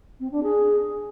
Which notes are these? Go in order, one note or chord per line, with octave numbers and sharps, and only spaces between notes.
C4
D4
G#4